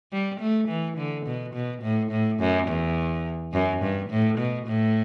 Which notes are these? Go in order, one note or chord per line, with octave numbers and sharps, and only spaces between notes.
G3
A3
E3
D3
B2
B2
A2
A2
F#2
E2
F#2
G2
A2
B2
A2